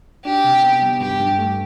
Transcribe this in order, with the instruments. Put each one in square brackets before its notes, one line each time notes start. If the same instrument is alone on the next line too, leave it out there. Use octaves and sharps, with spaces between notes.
[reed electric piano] D4 [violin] G4
[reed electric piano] C3
B3
G3
[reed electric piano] G2 [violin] G4
[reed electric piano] G2
A3